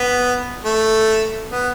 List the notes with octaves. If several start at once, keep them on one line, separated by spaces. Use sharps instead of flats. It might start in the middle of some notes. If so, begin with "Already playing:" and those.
Already playing: B3
A3
B3